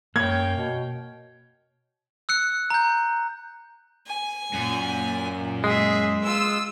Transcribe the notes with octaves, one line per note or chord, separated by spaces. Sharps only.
F#2 A#3 C#5 G5 G#6
B2
E6 F#6 C#7
A#5 G6
G#5
F#2 A#2
G#3 G#4 E5
F4 E6